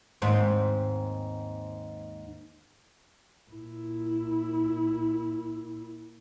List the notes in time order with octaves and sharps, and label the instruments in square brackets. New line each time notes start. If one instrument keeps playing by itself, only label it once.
[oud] D#2 G#2 C4
[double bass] A#2 E4